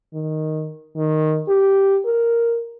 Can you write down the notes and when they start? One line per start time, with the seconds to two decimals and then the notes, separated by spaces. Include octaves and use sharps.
0.14 D#3
0.96 D#3
1.49 G4
2.05 A#4